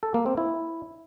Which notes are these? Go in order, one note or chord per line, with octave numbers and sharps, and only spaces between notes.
A4
A#3
C4
E4